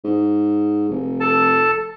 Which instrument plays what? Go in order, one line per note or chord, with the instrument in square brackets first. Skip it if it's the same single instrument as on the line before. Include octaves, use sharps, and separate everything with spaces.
[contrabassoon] G#2
F1
[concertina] A4 A5